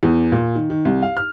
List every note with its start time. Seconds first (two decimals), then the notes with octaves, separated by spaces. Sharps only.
0.03 E2
0.32 A#2
0.55 D#3
0.70 D#3
0.85 C2
1.02 F5
1.17 F6